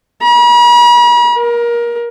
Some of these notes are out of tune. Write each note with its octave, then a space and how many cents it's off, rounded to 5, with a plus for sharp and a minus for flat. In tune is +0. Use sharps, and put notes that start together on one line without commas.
B5 -45
A#4 +25